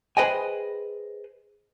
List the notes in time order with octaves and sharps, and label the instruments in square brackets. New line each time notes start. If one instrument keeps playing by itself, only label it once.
[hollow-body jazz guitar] G#4 B4 C5 D#5 G5 G#5